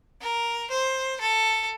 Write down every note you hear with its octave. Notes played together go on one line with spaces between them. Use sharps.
A#4
C5
A4